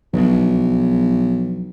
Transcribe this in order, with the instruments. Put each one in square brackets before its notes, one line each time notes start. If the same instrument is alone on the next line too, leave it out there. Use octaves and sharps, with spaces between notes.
[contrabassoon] B1 [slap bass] F3 F#3 D4